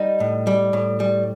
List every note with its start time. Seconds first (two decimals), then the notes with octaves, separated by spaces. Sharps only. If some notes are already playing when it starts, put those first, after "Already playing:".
Already playing: G3 D#4
0.20 A2
0.47 G3
0.73 A2
1.00 G3